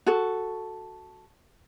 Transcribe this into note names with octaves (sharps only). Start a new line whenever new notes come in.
F#4 A4